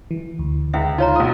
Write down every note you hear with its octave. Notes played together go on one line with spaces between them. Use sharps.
E3
D2
C#2 E4 E5
D#4 F4 C#5 A#5
B1 D#6